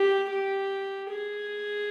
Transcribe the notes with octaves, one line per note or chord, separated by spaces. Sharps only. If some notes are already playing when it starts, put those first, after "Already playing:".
Already playing: G4
G4
G#4